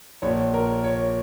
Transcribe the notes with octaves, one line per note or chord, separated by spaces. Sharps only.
A#1 A#2 C#5
A#4
C#5